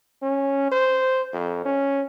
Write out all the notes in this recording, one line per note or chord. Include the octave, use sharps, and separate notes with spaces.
C#4
C5
F2
C#4